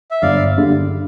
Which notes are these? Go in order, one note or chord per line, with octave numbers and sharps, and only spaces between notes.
E5
G1 D5 F5
G2 D3